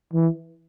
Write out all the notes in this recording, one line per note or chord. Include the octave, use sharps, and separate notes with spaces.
E3